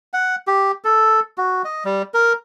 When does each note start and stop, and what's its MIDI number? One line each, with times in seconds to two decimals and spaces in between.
0.13 0.36 78
0.47 0.72 67
0.84 1.20 69
1.38 1.62 66
1.65 1.84 75
1.85 2.02 55
2.14 2.33 70